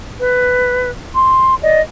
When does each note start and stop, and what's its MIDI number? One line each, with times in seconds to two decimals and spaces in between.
0.18 0.90 71
1.14 1.55 84
1.62 1.81 74
1.62 1.81 75